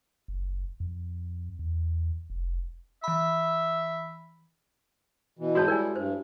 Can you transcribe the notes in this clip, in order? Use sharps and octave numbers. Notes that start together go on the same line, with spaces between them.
F#1
F2
E2
F1
E3 E5 B5
B2 E3
G#2 G#3 E4 F#4 C#5 A5
G3 A#4 D5 G#5
G2 C5